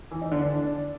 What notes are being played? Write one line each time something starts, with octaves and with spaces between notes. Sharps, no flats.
E3
D#4
D3
D4